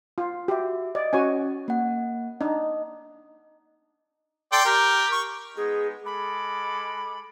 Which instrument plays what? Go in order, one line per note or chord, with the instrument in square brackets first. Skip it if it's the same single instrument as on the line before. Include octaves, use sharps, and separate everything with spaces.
[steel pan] F4
[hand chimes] F#4 E5 [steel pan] G4
[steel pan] D5 [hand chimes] D#5
[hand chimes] C#4 [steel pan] F#4 C#5 G#5
[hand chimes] A#3 F#5
[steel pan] D4 D#4 [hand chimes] D#5
[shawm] A4 [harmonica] D5 G5 C6
[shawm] G4 [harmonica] A#4
[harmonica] C#6
[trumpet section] G#3 B3 D#4 [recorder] G#4
[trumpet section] G#3 A4 D6 [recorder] B5